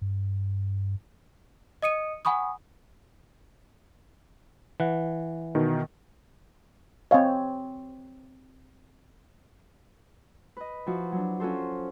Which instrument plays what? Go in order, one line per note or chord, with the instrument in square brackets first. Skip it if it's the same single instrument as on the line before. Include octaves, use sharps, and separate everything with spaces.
[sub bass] G2
[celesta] D#5 D#6 C#7 D#7
F#5 G#5 B5 C#6 D#6
[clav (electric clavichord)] E3 F#5
[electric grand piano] B2 D#3
[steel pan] C4 C#5 [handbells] D#5 F5 G#5
[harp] B4 D#5
F3 E4 F#4
F#3 D4
C#4 F4 F#4 A4 C5